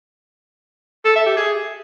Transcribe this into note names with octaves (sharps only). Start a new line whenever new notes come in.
A4
E5
G4
G#4